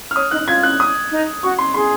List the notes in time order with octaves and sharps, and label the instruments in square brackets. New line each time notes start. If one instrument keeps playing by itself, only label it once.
[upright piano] F6
[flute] C#5 [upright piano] D#6
[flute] D#4 [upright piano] F#6
[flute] F4 [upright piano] G#6
[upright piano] F#6
D#6
[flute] D#4
[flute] F#4 [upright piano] C#6
[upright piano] C6
[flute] G#4 [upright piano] C6